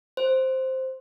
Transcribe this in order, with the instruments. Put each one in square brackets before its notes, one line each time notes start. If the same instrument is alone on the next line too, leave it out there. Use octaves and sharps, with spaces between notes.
[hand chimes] C5